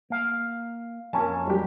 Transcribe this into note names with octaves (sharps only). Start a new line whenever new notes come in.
A#3 F5
F2 A#3 C#4 A#4 G#5 A5
F#3 G3 G4